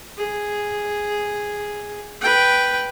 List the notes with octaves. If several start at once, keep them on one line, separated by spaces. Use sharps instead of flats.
G#4
B4 G5